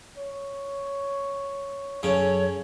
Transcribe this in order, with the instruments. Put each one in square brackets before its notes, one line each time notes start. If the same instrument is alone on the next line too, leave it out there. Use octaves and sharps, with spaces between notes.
[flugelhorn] C#5
[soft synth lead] F#2 [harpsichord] C#3 C#4 [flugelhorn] A4 [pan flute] C#5